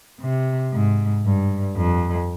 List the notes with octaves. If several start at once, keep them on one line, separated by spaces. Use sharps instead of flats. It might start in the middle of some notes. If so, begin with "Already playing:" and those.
C3
G#2
G2
F2